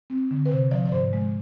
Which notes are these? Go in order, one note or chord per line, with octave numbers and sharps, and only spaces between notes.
C4
D3
B4
C3 C5
F3 D5
D5
G#2 C5
G#3